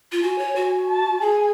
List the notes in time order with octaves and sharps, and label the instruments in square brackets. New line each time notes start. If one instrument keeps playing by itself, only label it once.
[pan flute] F4
[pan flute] F#4 [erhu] G#5
[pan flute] C#5
F#4
[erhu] A5
[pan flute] G#4 [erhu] G#5